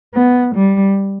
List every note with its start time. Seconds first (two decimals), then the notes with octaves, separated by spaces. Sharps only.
0.16 B3
0.55 G3